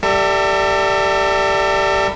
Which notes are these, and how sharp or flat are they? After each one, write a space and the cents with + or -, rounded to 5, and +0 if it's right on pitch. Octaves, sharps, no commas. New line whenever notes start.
G3 +0 A4 +35 E5 +10